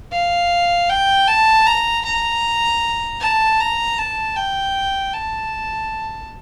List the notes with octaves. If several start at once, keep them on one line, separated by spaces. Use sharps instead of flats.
F5
G5
A5
A#5
A#5
A5
A#5
A5
G5
A5